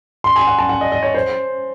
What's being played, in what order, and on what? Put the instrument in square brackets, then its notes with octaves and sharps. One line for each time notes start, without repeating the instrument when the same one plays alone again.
[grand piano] C6
G#5
F#5
A5
F#5
D#5
D#5
C#5
C5